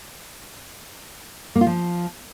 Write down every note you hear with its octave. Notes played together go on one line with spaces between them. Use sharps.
A#3
F4
F3